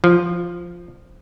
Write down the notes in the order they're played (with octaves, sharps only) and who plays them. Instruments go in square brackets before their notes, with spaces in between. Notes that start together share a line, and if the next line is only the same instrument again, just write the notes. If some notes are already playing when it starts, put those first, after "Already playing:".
[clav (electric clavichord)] F3